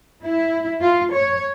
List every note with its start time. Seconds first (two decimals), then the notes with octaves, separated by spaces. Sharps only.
0.23 E4
0.81 F4
1.12 C#5